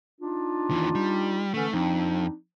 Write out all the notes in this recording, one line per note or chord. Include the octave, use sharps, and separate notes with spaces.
D4 D#4 F4
D#2 E3
G3
D3 E3 A3 C#4
F2 C4 D4 D#4